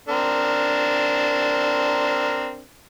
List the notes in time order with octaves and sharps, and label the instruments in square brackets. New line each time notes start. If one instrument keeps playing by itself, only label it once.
[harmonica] C4 D4 A#4